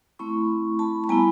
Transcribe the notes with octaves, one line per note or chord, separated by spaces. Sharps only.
A3 C4 E4 B5 C#6
A5 B5
B5
G3 B3 E4 G#5 A#5